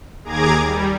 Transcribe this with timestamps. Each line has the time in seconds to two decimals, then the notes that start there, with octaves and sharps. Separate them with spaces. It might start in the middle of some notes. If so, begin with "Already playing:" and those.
0.24 D#2 G#4 A#5 D6 G#6
0.65 G3